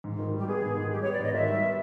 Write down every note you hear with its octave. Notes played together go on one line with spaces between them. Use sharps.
G#2
D#3
G3
G4
B3 G#4
G#2
D#3
G3 G4
B3 C#5
D5
G#2 D#5
D#3 E5
G3
B3